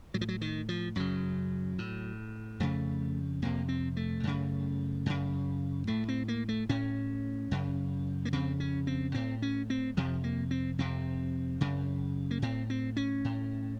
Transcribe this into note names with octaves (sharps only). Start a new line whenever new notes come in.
A2 F#3
F3
F#3
D#3
F3
F#2 C#3 F#3
A2
F2 C#3 A3
F2 C3 A#3
C4
A3
F#2 C#3
F#2 C#3
A2 A3
C4
A#3
A3
A2 C#4
F#2 C#3
A#3
F2 C#3 C4
C#4
C4
A2 C4
C#4
C4
F2 C3 F3
A#3
C4
F2 C3 C4
F#2 C#3
A#3
A2 C4
C4
C#4
A2